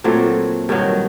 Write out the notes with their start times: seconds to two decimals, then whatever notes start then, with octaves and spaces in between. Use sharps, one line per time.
0.04 A#2 F#3 A3 C4
0.69 G2 D#3 F#3